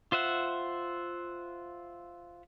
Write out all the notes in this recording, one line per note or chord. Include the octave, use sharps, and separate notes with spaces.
F4 C5 E5 F#5